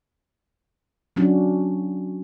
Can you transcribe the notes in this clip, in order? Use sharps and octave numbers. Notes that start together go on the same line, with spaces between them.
F#3 C#4 D4 F#4